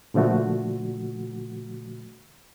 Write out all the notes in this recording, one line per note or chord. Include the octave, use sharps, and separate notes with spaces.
A#2 D3 F3 A3 F#4